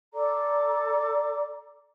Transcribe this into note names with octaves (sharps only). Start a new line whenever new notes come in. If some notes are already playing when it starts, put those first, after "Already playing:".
A4 D5 A#5 D6